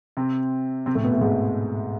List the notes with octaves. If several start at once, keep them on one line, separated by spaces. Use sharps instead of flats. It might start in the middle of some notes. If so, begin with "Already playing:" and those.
C3 C4
C3 C4
A2 A3
B2 B3
A2 A3
G#2 G#3